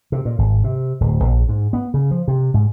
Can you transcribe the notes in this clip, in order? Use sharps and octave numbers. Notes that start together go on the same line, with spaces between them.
C3
A#2
G#1
C3
D1
A#1
G#2
B3
C#3
F3
C3
G#2